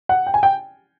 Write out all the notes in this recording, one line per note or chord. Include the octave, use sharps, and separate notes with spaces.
F#5
G5
G#5
G5